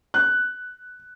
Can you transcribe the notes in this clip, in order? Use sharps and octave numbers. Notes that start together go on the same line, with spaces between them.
F#6